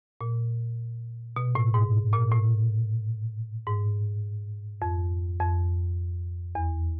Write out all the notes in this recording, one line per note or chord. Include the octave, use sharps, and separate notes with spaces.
A#2
B2
A2
G#2
A#2
A2
G#2
F2
F2
E2